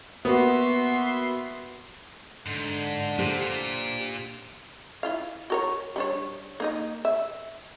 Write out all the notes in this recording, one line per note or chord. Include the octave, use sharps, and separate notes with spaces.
A#3 B3 F#4 E5 C6
G#2 D3
A#2 D4 G4 C5
E4 F4 F5
F#4 A#4 C#5
G3 D4 C#5
A#3 D#4 D#5
E5